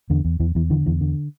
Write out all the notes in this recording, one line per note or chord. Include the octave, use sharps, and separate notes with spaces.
E2 D3
E2
E2 E3
E2 E3
D3 E3
E2 E3
D3